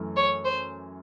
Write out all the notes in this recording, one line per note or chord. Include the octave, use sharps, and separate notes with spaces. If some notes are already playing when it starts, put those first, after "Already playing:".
Already playing: F#2 E3 A3
C#5
C5